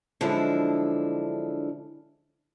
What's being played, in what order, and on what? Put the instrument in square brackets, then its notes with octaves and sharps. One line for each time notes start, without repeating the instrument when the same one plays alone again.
[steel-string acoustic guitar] D3 F3 F#3 G#3 D4 E4